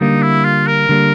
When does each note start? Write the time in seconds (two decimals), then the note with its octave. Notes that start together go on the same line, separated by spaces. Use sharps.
0.01 D3 G3 A#3 D#4
0.23 E4
0.45 F4
0.67 A#4
0.89 D3 G3 A#3